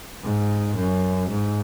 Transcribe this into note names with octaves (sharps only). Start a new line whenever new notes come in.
G#2
F#2
G#2